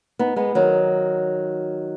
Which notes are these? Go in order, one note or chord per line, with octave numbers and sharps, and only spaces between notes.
B3 D#4
G#3 B3
D#3 F#3